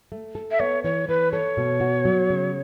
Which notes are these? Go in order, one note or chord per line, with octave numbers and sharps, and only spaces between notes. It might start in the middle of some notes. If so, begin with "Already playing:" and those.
A3
A4
E5
B3 C#5
E3 C#5
E3 B4
A4 C#5
B2
F#4
F#3
C#3